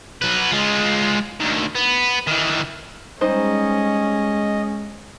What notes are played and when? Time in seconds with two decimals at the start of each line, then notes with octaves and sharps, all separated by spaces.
0.22 F#3 B4
0.51 G#3 F4
1.40 D2 D#3
1.75 B3
2.27 D#3 E3
3.21 G3 G#3 C#4 D#4 C5 D#5